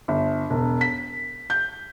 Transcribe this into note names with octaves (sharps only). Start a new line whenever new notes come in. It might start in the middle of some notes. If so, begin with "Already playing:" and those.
G1
E1
B6
G6